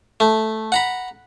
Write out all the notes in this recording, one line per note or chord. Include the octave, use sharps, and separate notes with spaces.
A3
F#5 A#5 B5